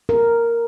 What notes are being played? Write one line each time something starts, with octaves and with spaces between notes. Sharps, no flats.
A#4